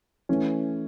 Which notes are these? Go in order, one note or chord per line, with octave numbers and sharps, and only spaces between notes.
E3 A3 C#4